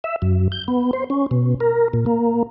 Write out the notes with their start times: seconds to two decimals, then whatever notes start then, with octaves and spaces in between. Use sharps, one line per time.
0.04 E5
0.22 F#2
0.52 G6
0.68 B3
0.93 C5
1.10 C#4
1.31 B2
1.60 A#4
1.93 A#2
2.06 A#3